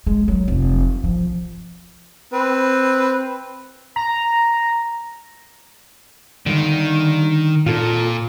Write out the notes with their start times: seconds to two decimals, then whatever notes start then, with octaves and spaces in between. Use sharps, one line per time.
0.06 G#3
0.28 F#3
0.48 F1
1.04 F3
2.32 C4 B4
3.96 A#5
6.46 D3 D#3 G3
7.66 A#2 F4 A4